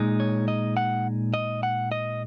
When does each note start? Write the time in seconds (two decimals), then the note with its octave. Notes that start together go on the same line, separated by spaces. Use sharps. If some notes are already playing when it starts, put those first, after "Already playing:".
Already playing: A#2 G#3 D#4
0.20 C#5
0.48 D#5
0.77 F#5
1.34 D#5
1.63 F#5
1.92 D#5